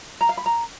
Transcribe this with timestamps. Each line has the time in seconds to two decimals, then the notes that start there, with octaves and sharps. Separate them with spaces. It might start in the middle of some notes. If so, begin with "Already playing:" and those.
0.21 A#5
0.29 F5
0.37 B5
0.46 A#5